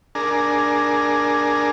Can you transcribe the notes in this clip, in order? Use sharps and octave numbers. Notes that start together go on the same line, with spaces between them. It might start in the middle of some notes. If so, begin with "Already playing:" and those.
D4 G#4 A#4